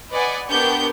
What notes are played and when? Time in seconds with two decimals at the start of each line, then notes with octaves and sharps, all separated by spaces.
0.11 B4 D5 D#5 F#5 G#5
0.50 B3 D4 G4 A#4 C#6 G6